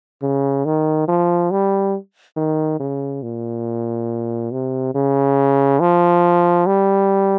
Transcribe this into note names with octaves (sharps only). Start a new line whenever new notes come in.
C#3
D#3
F3
G3
D#3
C#3
A#2
C3
C#3
F3
G3